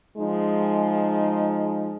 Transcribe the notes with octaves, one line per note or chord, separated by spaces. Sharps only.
F3 G#3 D#4